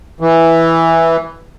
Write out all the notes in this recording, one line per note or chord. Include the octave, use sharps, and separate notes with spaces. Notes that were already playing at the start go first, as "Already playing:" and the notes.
E3